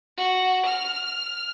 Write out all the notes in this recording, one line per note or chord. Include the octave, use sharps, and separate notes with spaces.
F#4
F6